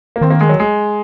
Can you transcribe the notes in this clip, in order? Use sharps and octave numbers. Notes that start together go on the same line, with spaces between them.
A#3
D#3 C4
A#3
G#3
F#3
G#3